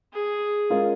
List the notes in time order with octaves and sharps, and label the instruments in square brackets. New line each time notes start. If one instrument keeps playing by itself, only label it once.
[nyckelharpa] G#4
[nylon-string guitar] G#3 C#4 F4 A#4 D#5